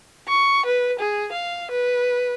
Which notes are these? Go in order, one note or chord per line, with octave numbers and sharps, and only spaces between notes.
C#6
B4
G#4
F5
B4